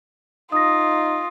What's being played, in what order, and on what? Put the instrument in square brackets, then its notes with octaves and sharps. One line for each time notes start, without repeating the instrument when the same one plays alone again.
[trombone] D#4 [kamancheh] F4 [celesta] D#6 A#6